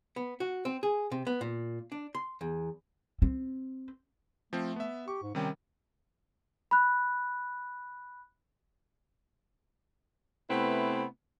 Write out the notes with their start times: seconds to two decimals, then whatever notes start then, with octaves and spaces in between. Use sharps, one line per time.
0.16 B3
0.40 F#4
0.65 C4
0.83 G#4
1.12 C3
1.27 B3
1.41 A#2
1.92 D4
2.15 C6
2.41 E2
3.22 C4
4.53 F3 A3 C4
4.76 B3 E5
5.08 G4 C#6
5.22 G#2
5.35 C3 D#3 G3 C#4
6.71 B5 F#6
10.50 C3 A3 B3 C4 E4 B4